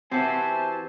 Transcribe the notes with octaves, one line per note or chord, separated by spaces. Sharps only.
E3 C4 F#4 G4 C5 E5 G#5 A5